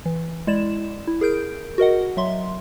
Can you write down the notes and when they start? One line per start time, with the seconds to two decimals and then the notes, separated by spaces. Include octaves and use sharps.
0.06 E3
0.47 G#3 E4 D5 E7
1.07 E4
1.21 G#4 A#4 G6 D7
1.78 F#4 A#4 D#5 F#5
2.17 F#3 E5 C6